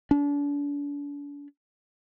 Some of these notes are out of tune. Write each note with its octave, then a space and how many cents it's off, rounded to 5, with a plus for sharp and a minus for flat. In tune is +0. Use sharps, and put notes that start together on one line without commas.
D4 -40